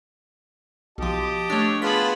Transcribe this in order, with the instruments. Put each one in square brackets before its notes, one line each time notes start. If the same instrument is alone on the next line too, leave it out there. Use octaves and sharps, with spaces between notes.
[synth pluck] B1 F3 [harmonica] G4 D#5 A5
[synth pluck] A3 D4 [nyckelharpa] C#5
[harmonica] B3 F4 A5 [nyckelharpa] G#4 B5 [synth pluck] B6